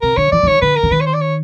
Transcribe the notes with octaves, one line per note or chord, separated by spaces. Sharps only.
C3 A#4
D3 C#5
E3 D5
E3
D#3 C#5
D3 B4
A#4
D3
D#3 B4
C#5
C5
D5
C#5